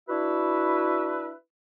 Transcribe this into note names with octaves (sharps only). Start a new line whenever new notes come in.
D4 E4 F#4 B4 E5